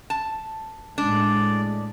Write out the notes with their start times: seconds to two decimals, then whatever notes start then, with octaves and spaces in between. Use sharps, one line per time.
0.10 A5
0.98 A2 G#3 A3 D4 D5